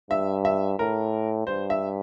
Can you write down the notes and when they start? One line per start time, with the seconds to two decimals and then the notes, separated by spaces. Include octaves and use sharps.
0.11 G2 E5
0.45 E5
0.79 A2 A#4
1.47 G2 C5
1.70 E5